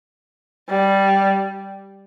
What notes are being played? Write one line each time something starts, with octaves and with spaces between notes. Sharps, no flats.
G3